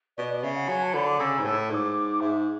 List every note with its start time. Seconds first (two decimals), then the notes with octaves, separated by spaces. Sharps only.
0.17 B2 D5
0.30 D5
0.43 C#3 E5
0.56 F#5
0.69 F#3 G#5
0.82 A5
0.94 D3 B5
1.07 D6
1.19 C#3 E6
1.39 G#2
1.45 A2 E6
1.70 G#2 E6
1.74 D6
2.21 G#2 E5